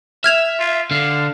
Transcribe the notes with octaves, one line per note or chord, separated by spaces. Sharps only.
E5 F6 G#6 F7
F4
D3 F5